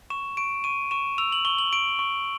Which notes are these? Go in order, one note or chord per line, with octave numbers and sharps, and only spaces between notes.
C#6 E7
C#6 D7
C#6 D#7
C#6 E7
E6 F7
F#7
C#6 G7
F#7
C#6 D7
C#6